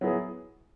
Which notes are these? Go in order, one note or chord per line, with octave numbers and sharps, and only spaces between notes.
F#3 B3 E4 G#4